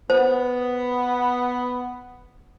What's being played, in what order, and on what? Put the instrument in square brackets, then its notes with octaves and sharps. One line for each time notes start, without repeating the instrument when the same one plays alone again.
[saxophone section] B3 [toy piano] C5